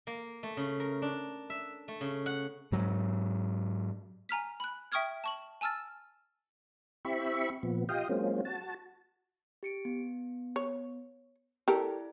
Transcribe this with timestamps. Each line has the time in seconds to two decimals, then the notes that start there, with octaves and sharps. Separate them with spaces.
0.07 A#3
0.43 A3
0.57 C#3
0.80 A#4
1.02 D4
1.50 E5
1.88 A3
2.01 C#3
2.26 F#5
2.72 G#2 F#3
4.29 G#5 A#5 F6 B6
4.60 B5 F#6
4.92 E5 G5 C#6 D#6 F6 G#6
5.24 A5 C#6 F#7
5.61 G#5 A5 E6 F6 A6
7.05 C4 E4 G4 E5 B5 C#6
7.63 A#2 F3 B3
7.89 F4 G4 D#5 F5 G5 D#6
8.09 F#3 G#3 A#3 C4 C#4 F4
8.45 F#4 A5
9.63 G4 C#7 D7
9.85 B3
10.56 C#5
11.68 E4 G4 A4 A#4 D5